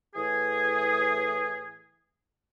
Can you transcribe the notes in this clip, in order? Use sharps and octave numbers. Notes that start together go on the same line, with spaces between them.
A2 E3 G#4